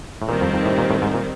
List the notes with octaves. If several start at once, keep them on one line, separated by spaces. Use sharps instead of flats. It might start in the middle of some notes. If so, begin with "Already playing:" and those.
A2
A#2 D#3 G3 C4
F2
F2
A2
A#2
A2
G#2
A#2